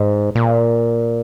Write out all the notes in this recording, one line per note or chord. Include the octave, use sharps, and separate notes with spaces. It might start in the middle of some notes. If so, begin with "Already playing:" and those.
Already playing: G#2
A#2